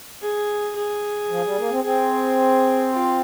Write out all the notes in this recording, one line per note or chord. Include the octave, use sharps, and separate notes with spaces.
G#4
G#4
F3
G3
A#3
C4
C4 G#4
F4